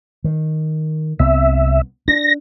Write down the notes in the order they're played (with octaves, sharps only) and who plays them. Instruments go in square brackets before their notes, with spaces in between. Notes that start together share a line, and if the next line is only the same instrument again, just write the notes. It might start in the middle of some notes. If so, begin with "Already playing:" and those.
[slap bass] D#3
[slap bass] C2 B3 C4 [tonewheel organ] E5
[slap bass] D4 [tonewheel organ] A#6